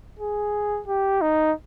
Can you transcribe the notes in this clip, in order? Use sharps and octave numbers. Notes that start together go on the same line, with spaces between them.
G#4
G4
D#4